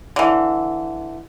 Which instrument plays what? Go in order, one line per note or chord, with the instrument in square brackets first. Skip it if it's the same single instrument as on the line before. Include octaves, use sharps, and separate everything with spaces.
[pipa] D3 E3